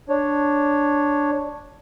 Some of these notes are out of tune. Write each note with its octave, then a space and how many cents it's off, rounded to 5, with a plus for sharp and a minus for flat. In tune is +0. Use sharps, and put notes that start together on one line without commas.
D4 +0 C#5 +0